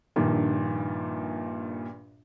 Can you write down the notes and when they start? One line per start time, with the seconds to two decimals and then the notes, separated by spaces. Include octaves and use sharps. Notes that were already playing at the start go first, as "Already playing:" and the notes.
0.16 A#1 G2 A#2 D#3